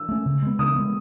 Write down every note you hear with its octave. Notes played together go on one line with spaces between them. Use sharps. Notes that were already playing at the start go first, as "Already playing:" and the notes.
Already playing: E6
A3 C#4
C#3
G#3 B3
C#3 D#6
G#3 B3